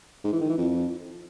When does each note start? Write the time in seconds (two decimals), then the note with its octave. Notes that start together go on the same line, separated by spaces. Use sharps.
0.24 G#2
0.33 E3
0.41 D#3
0.49 E3
0.58 F2